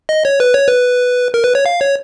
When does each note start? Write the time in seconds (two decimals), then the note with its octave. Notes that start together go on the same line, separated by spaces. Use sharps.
0.09 D#5
0.25 C#5
0.40 B4
0.54 C#5
0.68 B4
1.34 A#4
1.44 B4
1.55 C#5
1.66 F5
1.81 C#5